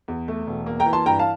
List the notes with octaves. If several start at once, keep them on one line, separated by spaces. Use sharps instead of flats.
E2
A3
E1
A#3
G5 A#5
E3
A5 C6
G2 G5 A#5
F5 A5